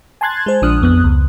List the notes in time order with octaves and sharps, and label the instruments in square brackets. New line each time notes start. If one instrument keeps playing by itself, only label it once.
[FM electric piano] G#5 A5 C6 F#6 G#6 A6
G#3 C5
A#1 F3 D4 D#6 F6 F#6
F2 B3 D#6 F#6
C#2